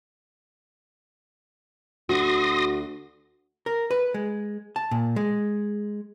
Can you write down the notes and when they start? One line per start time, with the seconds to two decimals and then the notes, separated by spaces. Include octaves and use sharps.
2.09 D2 F#4 C6 D#6 A#6
3.66 A#4
3.91 B4
4.14 G#3
4.76 A5
4.91 A#2
5.16 G#3